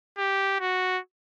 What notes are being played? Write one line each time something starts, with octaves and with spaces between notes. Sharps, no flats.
G4
F#4